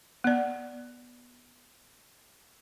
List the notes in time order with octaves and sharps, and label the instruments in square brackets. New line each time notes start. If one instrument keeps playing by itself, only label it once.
[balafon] B3 D5